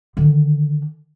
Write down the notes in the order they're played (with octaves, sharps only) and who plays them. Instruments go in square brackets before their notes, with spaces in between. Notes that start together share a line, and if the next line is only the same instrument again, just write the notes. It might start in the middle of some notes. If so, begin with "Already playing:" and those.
[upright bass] D3 D#3